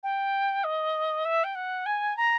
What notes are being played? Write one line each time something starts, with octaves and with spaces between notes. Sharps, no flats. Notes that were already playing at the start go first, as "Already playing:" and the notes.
G5
D#5
E5
G5
F#5
G#5
A#5